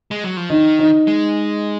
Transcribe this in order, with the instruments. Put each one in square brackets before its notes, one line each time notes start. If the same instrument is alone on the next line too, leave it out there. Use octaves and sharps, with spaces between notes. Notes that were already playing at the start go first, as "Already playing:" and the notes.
[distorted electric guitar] G#3
F#3
F3
[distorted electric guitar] D#3 [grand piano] D#4
[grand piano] D#4
[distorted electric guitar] G#3